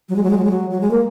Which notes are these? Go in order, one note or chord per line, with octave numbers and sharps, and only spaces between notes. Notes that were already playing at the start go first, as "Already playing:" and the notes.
F#3
G#3
F#3
G#3
F#3
G#3
F#3
F#3
G#3
A#3